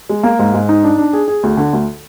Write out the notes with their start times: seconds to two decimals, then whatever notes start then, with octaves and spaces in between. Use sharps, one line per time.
0.09 G#3
0.23 A#3
0.39 G#2
0.54 G#2
0.69 D#4
0.84 D4
0.98 D4
1.13 G#4
1.28 G#4
1.43 D2
1.57 D3
1.73 D2